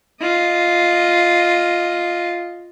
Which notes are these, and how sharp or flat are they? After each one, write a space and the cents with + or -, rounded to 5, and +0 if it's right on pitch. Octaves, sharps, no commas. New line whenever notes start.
F4 +0 D#5 +0